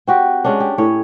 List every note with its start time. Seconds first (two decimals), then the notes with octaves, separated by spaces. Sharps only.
0.07 C4 F#4 G4
0.45 G#3 C#4 D4
0.60 G4
0.78 A2 C#4 C#5